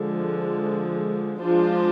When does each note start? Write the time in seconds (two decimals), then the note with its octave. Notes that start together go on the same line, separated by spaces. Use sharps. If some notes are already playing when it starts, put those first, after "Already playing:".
Already playing: D3 F3 G#3
1.41 F3 G#3 D4 F4 C5